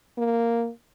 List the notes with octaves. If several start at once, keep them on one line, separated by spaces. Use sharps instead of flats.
A#3